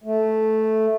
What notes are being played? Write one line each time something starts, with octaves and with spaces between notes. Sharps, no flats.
A3